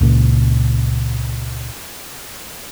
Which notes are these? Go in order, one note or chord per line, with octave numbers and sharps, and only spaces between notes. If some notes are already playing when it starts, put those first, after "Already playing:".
C#2 A#2